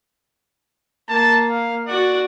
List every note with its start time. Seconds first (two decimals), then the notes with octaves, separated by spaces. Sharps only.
1.08 A#3 A5
1.49 F5
1.87 F#4 D5 F#5